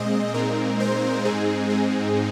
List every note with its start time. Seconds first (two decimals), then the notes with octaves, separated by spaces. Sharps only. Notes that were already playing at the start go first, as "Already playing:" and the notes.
Already playing: A#2 G#3 C4 D#5
0.34 A#2 G#3 C4 D#4 A#4
0.80 C5
1.25 G#2 G#3 C4 D#4 G#4
1.70 G#4